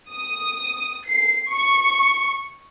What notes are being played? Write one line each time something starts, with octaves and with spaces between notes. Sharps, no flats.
D#6
C7
C#6